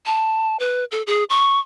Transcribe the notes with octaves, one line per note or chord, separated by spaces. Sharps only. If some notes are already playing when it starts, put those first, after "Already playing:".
A5
B4
A4
G#4
C#6